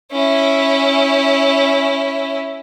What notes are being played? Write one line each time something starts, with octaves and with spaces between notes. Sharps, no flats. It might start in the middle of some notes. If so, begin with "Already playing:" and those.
C#4 E4